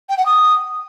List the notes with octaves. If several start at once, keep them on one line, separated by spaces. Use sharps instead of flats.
G5
F#5
D#6